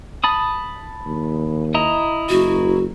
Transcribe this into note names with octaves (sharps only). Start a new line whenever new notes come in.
A5 B5 D#6
D#2
E4 D#5 A#5
F#1 F#4